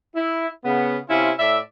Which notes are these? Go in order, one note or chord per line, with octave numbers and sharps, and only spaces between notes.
E4
C#3 B3
C3 C#4 E4 F4
A2 D5 E5